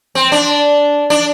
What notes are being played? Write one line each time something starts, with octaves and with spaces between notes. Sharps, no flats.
C4
D4
D4